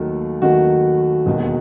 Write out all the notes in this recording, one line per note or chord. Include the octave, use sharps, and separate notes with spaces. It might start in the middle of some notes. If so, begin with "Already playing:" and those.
Already playing: D#2 D#3 F#3 A3
D#2 D#3 F#3 A3 F#4
E1 D#2 D#3